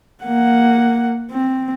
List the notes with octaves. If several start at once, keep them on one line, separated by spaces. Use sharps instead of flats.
A#3 F#5
C4